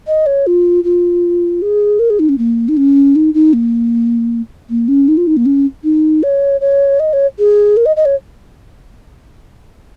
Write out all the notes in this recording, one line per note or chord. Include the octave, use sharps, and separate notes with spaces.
D#5
C#5
F4
F4
G#4
A#4
G#4
D#4
C#4
A#3
D#4
C#4
D#4
D#4
A#3
A#3
C#4
D#4
F4
D#4
A#3
C#4
D#4
C#5
C#5
D#5
C#5
G#4
A#4
D#5
D#5
C#5